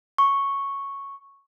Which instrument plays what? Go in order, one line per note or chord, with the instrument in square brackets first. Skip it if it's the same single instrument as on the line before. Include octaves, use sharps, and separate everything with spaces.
[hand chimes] C#6